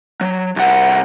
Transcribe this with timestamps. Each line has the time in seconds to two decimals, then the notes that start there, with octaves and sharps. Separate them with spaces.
0.21 F#3
0.56 C2 F#5